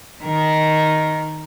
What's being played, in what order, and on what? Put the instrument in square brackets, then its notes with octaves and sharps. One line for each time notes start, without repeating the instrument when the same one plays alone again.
[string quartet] D#3 A#4